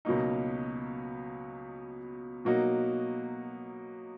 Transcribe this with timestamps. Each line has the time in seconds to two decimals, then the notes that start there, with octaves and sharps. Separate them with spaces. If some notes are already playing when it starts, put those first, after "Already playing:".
0.05 C#2 B2 F#3 A#3 D#4
2.45 B2 F#3 A#3 D#4 F#4